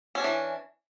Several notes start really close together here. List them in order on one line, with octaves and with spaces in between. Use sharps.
C#4 D4 E3